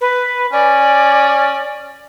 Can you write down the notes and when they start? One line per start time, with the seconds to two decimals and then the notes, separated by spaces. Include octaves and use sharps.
0.01 B4
0.52 C#4 D5